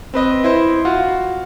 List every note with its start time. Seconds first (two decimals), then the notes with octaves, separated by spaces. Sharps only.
0.14 C4 B4 D#5
0.44 E4 C5
0.85 F4 F#4